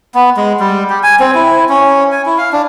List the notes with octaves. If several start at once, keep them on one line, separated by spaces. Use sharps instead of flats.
B3
G#3
G3
G4
G#5
C4
E4
C#4
G#5
E4
F5
D4